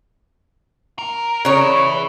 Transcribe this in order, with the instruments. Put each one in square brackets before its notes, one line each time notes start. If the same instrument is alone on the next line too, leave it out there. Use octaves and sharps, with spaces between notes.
[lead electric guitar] A#4
[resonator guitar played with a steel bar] C#3 C#5
[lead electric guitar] E3 E4